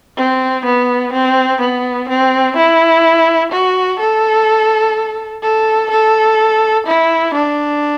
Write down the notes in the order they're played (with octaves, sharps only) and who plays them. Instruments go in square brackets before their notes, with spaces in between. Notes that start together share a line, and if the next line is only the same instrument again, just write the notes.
[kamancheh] C4
B3
C4
B3
C4
E4
F#4
A4
A4
A4
E4
D4